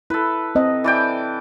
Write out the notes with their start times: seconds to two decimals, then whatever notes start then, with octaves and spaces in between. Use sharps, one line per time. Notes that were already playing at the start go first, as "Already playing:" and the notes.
0.10 E4 A4 B4
0.55 C4 D#5
0.84 E3 D5 G5